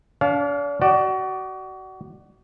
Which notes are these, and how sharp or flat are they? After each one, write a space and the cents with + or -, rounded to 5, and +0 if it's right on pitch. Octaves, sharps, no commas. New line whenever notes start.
D4 -40 F5 +10
F#4 +30 D5 +20